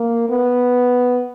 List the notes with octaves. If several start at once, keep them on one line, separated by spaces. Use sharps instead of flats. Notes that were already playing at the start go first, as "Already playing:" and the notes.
Already playing: A#3
B3